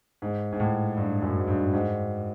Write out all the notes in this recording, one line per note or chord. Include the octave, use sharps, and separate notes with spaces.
G#2
G#2
A2
G2
F#2
G#2
G2
G#2